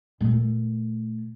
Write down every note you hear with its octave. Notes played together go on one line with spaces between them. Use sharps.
A#2 A3